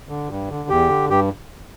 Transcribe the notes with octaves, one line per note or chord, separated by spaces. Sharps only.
D3
G2
D3
E2 G4
D3
G2 G4